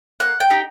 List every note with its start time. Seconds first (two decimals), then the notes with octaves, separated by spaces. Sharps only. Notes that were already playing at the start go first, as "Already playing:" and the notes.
0.20 A#3 F#5
0.40 G5
0.50 D#4 G4